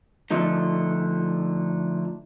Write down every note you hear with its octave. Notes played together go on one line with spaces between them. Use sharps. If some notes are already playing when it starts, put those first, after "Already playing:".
D3 F3 A3 D#4